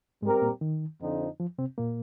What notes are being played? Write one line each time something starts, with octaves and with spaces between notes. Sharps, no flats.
G#2 G3 G#3 C4 G4 A#4
A#2 A#3
D#3
F2 D3 F3 C4 D#4
F3
C3 C4
A#2 A#3